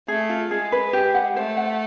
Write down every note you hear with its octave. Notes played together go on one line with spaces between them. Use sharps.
A3 G#4
F4
G#3 G#4
B4
G4
F#5
A3 C5
F#5